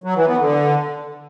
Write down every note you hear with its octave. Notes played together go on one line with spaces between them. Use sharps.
F#3
E3
B3
D3